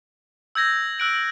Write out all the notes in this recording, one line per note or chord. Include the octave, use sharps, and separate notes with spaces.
E6 G6 G#6 A#6
E6 F#6 D7 F#7